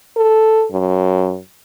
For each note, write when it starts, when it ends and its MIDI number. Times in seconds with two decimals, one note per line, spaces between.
0.17 0.66 69
0.71 1.38 42